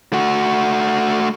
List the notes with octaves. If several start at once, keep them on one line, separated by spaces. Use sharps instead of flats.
A3 F#4